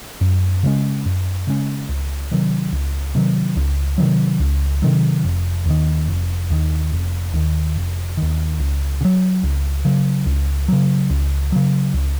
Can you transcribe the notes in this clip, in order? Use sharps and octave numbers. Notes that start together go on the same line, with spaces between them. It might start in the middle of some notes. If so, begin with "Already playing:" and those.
F#2
C#3 G#3 C#4
F#2
C#3 G#3 C#4
C#2
C3 D#3 F#3
C#2
C3 D#3 F#3
C#2
C3 D#3 F#3
C#2
C3 D#3 F#3
F1
D#2 D#3
F1
D#2 D#3
F1
D#2 D#3
F1
D#2 D#3
C#2
C#3
F#3
C#2
C#3 F#3
C#2
C#3 F#3
C#2
C#3 F#3
C#2